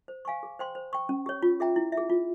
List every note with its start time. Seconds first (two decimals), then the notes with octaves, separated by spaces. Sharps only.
0.08 C5
0.25 F5 G#5 C#6
0.43 G#4
0.59 C5 G5 C6
0.75 C5
0.93 G5 C#6
1.09 C#4
1.26 G4 C#5
1.42 F4
1.60 G#4 E5 G5 A#5
1.76 E4
1.92 E5
1.97 G#4
2.09 F4